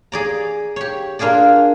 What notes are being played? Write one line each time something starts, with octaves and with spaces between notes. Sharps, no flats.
G#4 D5 A#5
G4 C#5
A#3 D4 F4 G#4 D5